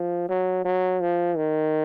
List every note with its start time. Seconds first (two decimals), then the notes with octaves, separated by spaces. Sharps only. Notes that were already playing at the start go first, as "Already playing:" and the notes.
Already playing: F3
0.29 F#3
0.65 F#3
1.00 F3
1.37 D#3